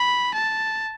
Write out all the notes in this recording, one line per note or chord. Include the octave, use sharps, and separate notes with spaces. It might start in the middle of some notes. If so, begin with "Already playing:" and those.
Already playing: B5
A5